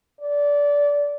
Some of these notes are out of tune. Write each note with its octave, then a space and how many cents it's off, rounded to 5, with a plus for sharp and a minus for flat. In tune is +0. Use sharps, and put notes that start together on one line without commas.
D5 -20